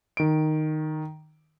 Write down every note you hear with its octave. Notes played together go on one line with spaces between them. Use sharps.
D#3 D7